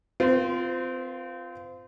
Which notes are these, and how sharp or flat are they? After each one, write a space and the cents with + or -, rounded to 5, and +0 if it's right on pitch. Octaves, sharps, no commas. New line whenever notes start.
C4 -25 F4 +0 A#4 +40